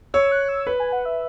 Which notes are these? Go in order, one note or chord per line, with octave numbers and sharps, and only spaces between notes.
C#5 E6
F#6
E6
B4
G#5
F#5
E5